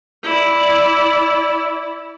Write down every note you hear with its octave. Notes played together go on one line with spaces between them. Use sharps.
E4 D5